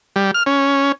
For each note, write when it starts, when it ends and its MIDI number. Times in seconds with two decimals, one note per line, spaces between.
0.16 0.31 55
0.34 0.43 89
0.46 0.92 61